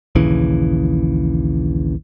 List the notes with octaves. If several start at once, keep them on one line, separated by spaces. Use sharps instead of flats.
A#1 D#2 C#3 E3